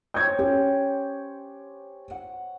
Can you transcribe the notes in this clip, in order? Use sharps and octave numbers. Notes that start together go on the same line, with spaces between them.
C5 C#5 G5 G6 G#6
C#4 G4
F#5